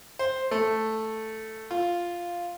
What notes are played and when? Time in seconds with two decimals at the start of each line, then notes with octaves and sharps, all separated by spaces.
0.19 C5
0.51 A3
1.71 F4